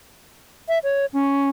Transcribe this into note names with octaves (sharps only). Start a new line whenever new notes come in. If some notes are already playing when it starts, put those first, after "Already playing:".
E5
C#5
C#4